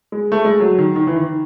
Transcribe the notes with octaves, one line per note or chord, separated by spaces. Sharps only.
G#3
A3
G#3
F#3
D#3
D#3
E3
D#3